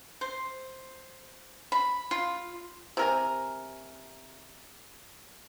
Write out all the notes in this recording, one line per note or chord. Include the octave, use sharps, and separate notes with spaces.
C5
B5
F4
C3 A#4 G#5